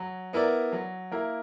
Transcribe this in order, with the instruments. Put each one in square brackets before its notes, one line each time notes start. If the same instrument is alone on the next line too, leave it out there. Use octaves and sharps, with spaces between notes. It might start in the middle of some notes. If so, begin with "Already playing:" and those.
Already playing: [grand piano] F#3
B3 E4 A#4 D5
F#3
A#3 E4 A#4